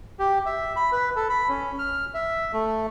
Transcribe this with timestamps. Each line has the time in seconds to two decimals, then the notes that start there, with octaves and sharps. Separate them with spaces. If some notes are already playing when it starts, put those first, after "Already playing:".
0.19 G4
0.46 E5
0.76 B5
0.92 B4
1.16 A4
1.29 B5
1.49 C#4
1.79 F6
2.14 E5
2.53 A3